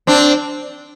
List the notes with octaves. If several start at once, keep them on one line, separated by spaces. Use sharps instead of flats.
C4 D4